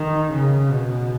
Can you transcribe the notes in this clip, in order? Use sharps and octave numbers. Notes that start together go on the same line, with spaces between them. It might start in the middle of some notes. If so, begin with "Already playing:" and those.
Already playing: D#3
C#3
B2